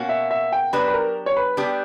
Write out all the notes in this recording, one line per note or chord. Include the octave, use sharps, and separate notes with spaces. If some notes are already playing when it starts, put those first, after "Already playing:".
Already playing: B2 A#3 C#4 F#4
E5
E5
G5
F#3 B3 D4 G4 B4
B4
A#4
C#5
B4
G3 B3 D4 G4